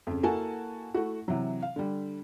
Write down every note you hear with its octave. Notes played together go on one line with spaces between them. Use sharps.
F2 C#3
A#3 E4 F#4 A4 G#5 A5
A3 E4 F#4
C3 E3 F#3
F5
D3 G3